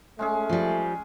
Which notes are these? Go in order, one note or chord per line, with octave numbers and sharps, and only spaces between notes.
G#3 A3 C#4 G#4
F3 G3